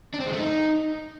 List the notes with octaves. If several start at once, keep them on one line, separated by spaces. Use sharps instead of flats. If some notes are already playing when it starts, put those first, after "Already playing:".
D4
C4
G#3
A3
D#4